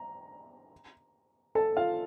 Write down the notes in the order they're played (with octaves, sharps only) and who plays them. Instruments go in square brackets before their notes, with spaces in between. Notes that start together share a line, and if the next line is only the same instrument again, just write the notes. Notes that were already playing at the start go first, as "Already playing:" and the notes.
Already playing: [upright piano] A#5
A4 A5
F4 F5